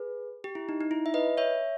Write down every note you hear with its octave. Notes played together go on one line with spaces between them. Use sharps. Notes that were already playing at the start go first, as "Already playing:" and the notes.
Already playing: G#4 B4
G4
E4
D#4
D#4
E4
E5
B4 D#5
C#5 E5